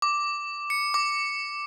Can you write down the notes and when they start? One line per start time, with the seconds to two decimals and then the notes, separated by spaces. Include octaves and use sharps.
0.02 D6
0.70 C#7
0.94 D6